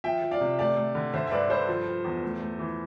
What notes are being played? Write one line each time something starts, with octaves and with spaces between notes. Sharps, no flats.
F3 E5 G5
F3
D5 F5
C3
A3 D5 F5
A3
D3
D3 C5 E5
E5
G2 B4 D5
G2 A4 C5
F3
F3
E2
A3
A3
E3